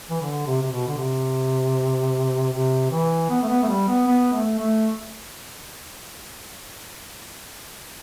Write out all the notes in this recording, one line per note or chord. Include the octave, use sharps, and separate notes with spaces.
E3
D3
C3
C3
B2
D3
C3
C3
E3
B3
A3
B3
A3
G3
B3
B3
A3
A3